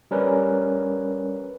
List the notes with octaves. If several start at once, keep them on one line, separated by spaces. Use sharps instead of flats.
G3 C#4 A#4 B4